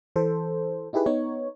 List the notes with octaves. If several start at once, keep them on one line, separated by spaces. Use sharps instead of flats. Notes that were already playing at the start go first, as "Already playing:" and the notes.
E3 A4 C5
D#4 E4 G4 G#4 B4
B3 D#4 C#5